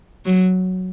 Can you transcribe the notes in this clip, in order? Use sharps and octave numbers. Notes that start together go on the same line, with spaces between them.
F#3